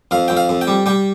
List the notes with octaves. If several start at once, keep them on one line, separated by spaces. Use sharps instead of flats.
F2 F5
F2 G5
F5
F2
G5
G3
G3 G5